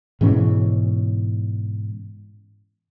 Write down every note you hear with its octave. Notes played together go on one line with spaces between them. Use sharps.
G#2 B2 E3 C#4